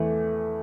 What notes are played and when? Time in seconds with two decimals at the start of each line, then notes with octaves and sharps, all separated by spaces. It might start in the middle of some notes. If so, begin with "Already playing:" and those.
Already playing: E2 E3 A3